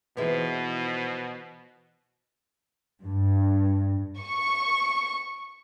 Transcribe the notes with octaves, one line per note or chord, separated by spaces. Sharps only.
B2 E3 F3 D#4 E4 G#4 B4
G2
C#6